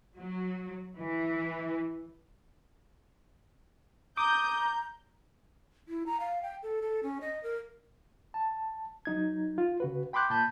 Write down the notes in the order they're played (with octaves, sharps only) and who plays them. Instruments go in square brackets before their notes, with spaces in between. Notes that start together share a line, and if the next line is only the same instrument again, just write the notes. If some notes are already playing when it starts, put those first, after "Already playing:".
[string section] F#3
E3
[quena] A#5 [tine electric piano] D6 [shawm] D#6 [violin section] G6
[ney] E4
A#5
F5
G5
A4
A4
C#4
D#5
A#4
[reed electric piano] A5
F#3 D#4 G#6
F4
C#3 F#4 B4
G5 B5 C6 D6 F#6 G6
A#2 A5 B5 G6